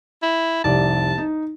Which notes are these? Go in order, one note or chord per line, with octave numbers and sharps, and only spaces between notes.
E4
F1 C2 D5 A5
D#4